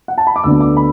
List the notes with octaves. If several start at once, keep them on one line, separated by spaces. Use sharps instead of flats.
F#5
A5
B5
D6
D2 D3 B3 D4 E6
D6
B5